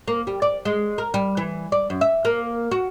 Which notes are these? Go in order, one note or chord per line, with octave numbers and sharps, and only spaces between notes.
A#3
G3
D5
G#3
A#4
G3
E3
D5
F#2
E5
A#3
F#4